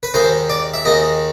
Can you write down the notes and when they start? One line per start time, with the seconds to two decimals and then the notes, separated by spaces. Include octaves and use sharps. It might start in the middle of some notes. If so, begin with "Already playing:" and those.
0.03 B4
0.14 D#2 D#3 G#3 C5
0.49 D5
0.74 E5
0.85 D#2 D#3 G#3 D#5